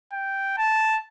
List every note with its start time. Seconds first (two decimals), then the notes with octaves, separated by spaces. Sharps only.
0.13 G5
0.57 A5